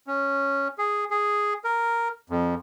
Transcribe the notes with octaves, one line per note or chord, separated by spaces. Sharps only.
C#4
G#4
G#4
A#4
F2